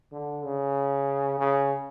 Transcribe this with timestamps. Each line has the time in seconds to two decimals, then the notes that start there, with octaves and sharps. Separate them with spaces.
0.12 D3
0.44 C#3
1.39 C#3